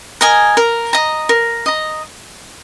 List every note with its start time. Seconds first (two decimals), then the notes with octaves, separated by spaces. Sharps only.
0.21 A#4 D#5 G#5
0.57 A#4
0.93 D#5 A#5
1.29 A#4
1.66 D#5 A#5